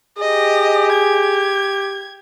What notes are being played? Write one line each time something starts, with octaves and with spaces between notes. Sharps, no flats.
G4 G#4 D#5
G#6